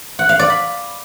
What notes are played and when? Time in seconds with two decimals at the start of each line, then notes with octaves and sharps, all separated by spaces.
0.19 F#5
0.29 F5
0.39 D5
0.50 B5